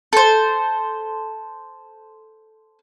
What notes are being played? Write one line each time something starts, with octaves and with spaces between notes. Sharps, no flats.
A4 C5